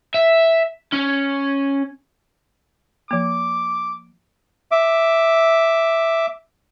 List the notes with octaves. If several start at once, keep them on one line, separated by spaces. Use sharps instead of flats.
E5
C#4
F3 A#3 D6
E5 D6